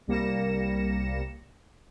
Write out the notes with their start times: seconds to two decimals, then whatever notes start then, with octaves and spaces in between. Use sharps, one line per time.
0.07 C2 G3 A#3 A#6 C#7 E7